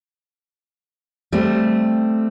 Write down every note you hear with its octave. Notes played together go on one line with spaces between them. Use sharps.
G3 A3 C4